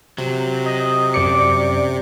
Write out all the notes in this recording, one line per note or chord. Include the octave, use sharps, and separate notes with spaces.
C3 F#3
D#5
F#2 D5 D6 C#7